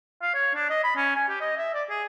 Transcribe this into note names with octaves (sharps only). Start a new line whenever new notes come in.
F5
C#5
D4
D#5
B5
C#4
G#5
G4
D#5
E5
D5
G#4